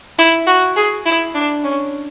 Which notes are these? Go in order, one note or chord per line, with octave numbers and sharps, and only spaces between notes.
E4
F#4
G#4
E4
D4
C#4